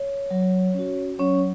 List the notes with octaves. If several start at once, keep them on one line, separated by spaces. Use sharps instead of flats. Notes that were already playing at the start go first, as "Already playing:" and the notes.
Already playing: C#5
F#3
C#4 F#4
F#3 C#4 C#5